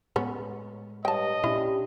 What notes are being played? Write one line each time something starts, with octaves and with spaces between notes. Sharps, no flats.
A2 G#3 B3 C#4
G2 C#5 D#5 G5 A5
A#2 C#4 D4 E4 G4